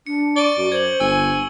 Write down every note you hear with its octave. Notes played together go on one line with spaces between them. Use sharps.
D4 C#7
D5 C#6 D7 G7
F#2 F#4
C5 G#6 F#7
G1 G#5 E6